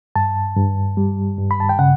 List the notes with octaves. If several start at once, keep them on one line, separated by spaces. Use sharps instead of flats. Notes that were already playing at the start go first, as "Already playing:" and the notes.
G2 A5
G2
G3
G2
B5
A5
G5
C#3 F#5